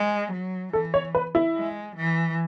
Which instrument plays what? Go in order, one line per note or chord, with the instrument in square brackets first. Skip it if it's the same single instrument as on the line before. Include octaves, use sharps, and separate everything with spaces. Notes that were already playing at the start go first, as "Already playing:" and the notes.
Already playing: [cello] G#3
F#3
[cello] E3 [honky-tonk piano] A4
[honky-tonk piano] C#5
B4
E4
[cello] G#3
E3